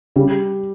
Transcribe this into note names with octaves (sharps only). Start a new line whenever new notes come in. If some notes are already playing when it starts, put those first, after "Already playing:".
C#3 G3